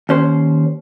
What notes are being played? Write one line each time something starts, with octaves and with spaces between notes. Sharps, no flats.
D#2 C#4 C5